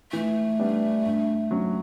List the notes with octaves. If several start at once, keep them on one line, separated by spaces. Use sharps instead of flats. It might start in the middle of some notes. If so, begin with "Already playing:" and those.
E3 A3
G3 B3 D4 G4
G2
F#3 C#4